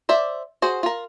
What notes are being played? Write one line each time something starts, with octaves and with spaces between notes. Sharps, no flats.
C5 D5 E5
F#4 G#4 C5
F4 A#4